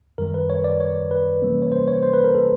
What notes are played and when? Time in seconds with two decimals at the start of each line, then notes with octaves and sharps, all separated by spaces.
0.18 F#2 D#3 G3 A#4
0.34 B4
0.50 C#5
0.64 D5
0.80 C#5
1.11 B4
1.42 C3 E3 G3 A#3 C#4
1.62 C#5
1.72 C5
1.88 C#5
2.03 C5
2.14 B4
2.24 A#4
2.34 A4